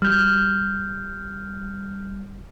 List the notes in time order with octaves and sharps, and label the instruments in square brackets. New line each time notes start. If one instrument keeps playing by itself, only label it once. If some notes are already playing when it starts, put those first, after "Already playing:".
[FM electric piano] G3 [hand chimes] F6 G6